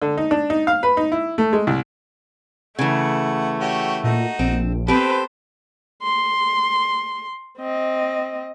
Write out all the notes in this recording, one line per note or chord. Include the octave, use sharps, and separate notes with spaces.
D3
D#4
D4
D#4
F5
B4
D#4
E4
A3
G#3
C2
C#3 E3 A3 F#5
F#4 G4 C#5
A#2 D#4 F#4
A#1 C4
C4 G4 A4 B4 C5
C6
C4 D#5